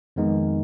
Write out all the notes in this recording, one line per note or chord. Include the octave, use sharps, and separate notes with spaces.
F2 D#3 G#3 B3 D#4